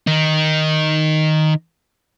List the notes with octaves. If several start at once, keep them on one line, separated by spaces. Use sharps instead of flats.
D#3 D#4